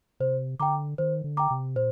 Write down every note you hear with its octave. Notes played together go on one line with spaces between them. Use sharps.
C3 C5
D3 G5 A#5 D6
D#3 C5
D3
G5 A#5 D6
C3
A#2 C5